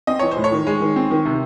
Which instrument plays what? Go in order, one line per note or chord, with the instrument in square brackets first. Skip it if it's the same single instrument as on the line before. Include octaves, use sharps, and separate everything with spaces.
[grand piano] C4 D#5
E3 C#5
C5
A2
C#5
D#3
G#3
D#3
C4
D#3
C3